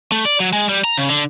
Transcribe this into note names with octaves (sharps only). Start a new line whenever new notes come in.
A3
D5
F#3
G#3
G3
A#5
C#3
D3